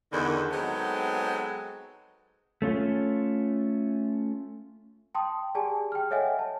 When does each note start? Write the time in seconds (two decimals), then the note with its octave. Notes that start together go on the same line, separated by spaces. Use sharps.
0.11 E2 D3 D#3
0.51 F#3 G#3 B3 C4 D#4 A4
2.62 A3 C#4 F4
5.15 G5 A5 C6 D#6
5.55 G4 G#4 D5 G#5 A5
5.92 G5 F6
6.10 A4 C#5 D#5 E5 F#5 G#5
6.39 A5